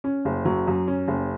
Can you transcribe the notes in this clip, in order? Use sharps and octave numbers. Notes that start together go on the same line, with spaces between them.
C#4
F#1
F#3
F#2
C#4
F#1